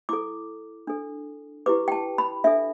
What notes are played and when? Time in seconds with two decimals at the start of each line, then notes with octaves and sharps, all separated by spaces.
0.09 E4 A4 D6
0.87 D4 A4
1.66 E4 G4 B4 D6
1.88 G5
1.92 A5
2.18 B5
2.44 D4 A4 E5